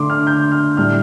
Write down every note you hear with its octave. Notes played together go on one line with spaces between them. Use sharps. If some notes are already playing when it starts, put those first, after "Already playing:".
Already playing: D3 A3 D4 C6 D6
F6
G6
F6
A2 G3 D4 F6